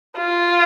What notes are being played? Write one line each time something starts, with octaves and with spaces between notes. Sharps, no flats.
F4